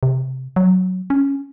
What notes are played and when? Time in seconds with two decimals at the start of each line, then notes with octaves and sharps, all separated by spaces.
0.03 C3
0.56 F#3
1.10 C#4